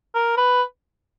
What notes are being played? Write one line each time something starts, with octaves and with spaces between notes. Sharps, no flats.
A#4
B4